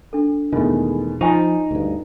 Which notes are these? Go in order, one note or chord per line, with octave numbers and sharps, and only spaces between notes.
D4 A4
E2 B2 D#3 G#3 A3 F4
F3 D#4 F4 D#5 G#5 C#6
D2 G2